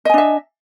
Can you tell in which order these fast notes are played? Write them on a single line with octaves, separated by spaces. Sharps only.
D#5 G#5 D4 E5